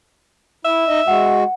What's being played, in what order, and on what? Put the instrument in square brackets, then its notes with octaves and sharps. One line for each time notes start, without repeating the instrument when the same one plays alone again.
[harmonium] E4 [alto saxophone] E5
[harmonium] D#4 D#5
[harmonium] G#3 F#4 [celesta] F#5